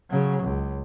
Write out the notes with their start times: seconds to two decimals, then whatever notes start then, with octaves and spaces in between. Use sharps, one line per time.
0.10 C#3 F#3
0.43 C#2